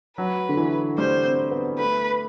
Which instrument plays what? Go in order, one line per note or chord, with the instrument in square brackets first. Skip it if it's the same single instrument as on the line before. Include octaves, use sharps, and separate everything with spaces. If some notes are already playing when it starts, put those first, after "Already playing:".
[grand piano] F#3 [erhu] B4
[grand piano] D3
E3
[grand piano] G3 [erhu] C5
[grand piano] C4
B3
[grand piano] A3 [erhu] B4